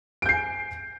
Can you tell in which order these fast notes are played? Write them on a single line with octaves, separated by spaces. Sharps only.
D7 G6 C7 G#5